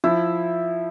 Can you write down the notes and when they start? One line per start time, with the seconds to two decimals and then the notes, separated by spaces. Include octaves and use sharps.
0.04 F3 E4